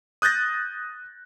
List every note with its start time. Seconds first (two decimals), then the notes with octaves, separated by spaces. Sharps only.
0.22 D#6 F#6 G6 A6 A#6